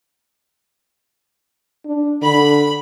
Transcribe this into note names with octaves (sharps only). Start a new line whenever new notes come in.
D4
D3 B5